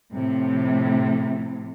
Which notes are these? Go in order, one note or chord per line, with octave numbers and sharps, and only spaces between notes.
A2 C3 F3